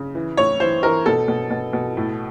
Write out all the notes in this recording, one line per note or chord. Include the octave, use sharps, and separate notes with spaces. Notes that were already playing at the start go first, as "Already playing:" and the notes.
Already playing: C#3
E3
A2 C#5
E3 C5
E3 A#4
B2 A4
B2
B2
B2
A2